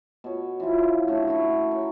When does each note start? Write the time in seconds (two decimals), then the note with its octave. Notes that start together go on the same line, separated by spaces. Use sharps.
0.24 B2 C#5
0.60 E3 F3 F4
1.08 D3 F#3 A3 C#4
1.28 A3 E4 F#4
1.71 A#4 C#5